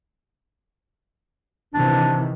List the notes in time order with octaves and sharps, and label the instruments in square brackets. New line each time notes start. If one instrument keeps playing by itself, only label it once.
[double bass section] C3 D#3 E3 [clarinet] D4